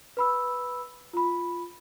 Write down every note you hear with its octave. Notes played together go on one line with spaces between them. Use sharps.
B4 B5 E6
F4 B5